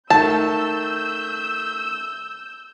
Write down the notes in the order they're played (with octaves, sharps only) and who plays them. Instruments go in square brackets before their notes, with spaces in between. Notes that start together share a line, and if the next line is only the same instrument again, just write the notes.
[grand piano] D#3 A3 [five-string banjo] A5 [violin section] E6 G6